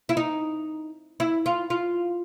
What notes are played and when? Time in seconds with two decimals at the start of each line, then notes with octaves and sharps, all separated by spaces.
0.09 E4
0.17 D#4
1.20 E4
1.46 F4
1.70 F4